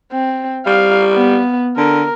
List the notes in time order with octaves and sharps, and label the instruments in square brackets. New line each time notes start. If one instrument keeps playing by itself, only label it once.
[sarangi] C4
[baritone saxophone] G3 [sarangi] F5
[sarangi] B3
[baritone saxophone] D3 [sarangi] A#4